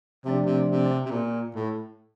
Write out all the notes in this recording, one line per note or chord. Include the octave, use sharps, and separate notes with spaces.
C3 F3 A3 D4 G4 D5
C3
C3
C3
A#2
A2